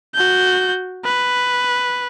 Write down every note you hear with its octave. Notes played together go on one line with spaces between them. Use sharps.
F#4 G6
B4